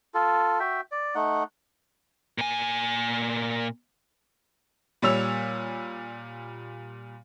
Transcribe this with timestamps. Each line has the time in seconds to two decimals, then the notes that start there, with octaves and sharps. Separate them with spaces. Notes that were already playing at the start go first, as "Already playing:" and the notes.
0.14 F4 A4
0.60 F#4 E5 G5
0.92 D5
1.15 A3 D#4 F#5
2.38 A#2 G#5
5.02 A#2 G3 C#5 E6 F7